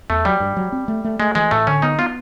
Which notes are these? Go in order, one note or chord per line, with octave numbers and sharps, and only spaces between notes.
E2 A3
F#3 G3
G2
F#3
C4
A3
A3
G#3 A3
E3 G#3
A2 A3
D3 C#4
B3 D#4
B3 F4